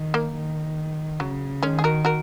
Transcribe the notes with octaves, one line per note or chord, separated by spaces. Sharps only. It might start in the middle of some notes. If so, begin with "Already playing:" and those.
Already playing: D#3
A#3
D#3
C#3 F#3
D#3 G#3 C#4
G#4
F#4 A#4
F#4 A#4